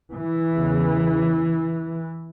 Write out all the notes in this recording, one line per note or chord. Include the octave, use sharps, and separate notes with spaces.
E3
E2 C#3